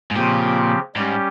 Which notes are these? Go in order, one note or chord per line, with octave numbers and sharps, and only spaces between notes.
G#2
A#2 C#3 F3 C4 G4
G#2 G3 C#4 G4